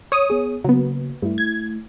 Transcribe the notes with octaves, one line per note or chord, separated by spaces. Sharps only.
C#5 D#6
B3 G#4
C#3 F#3 A#3 B3
G2 A3 E4
G#6